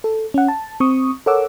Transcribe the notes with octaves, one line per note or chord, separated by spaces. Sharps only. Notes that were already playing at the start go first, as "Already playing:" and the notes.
A4
C#4 F#5
A5
C4 C#6 D#6
A4 A#4 C#5 F#5 D6 E6